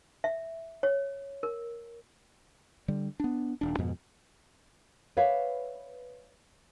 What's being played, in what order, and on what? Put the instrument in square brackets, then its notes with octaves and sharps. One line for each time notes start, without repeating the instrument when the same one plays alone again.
[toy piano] E5
C#5
A#4
[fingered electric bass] D3 G3
B3 D4
D#1 D4
F2 G#2 B2
[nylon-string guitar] B4 C#5 D5 E5 F5